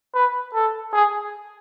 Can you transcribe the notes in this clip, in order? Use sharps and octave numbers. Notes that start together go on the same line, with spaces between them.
B4
A4
G#4